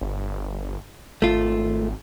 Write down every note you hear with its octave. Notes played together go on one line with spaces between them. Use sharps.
G1
G#1 A3 F4